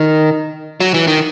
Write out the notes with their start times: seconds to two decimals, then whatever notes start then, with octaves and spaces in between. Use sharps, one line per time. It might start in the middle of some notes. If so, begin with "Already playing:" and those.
Already playing: D#3
0.80 F#3
0.94 E3
1.07 D#3